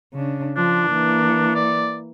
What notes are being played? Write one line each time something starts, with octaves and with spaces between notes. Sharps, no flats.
C#3 D4
F3 D4
E3 A#3
D5